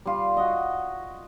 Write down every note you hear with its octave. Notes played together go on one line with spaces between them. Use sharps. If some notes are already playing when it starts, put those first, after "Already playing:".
G3 F4
F#4 D#5